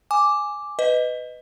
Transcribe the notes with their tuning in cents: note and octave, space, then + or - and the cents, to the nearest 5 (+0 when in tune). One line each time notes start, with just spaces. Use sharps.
G#5 +0 D6 +0
B4 +15 D#5 +0